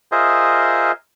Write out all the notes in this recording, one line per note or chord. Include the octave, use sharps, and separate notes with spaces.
F4 G#4 A#4 C5 D#5 E5